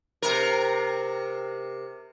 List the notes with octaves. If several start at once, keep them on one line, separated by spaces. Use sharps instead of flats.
C3 A#4